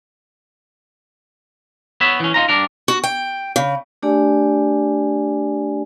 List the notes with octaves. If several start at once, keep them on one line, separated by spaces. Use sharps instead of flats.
B3 C#5 E5
E3 C#4
D#4 F4 A#5
G2 D4 A#4
F#4
G5
C#3
A3 D4 G4 G#4 D5 G#5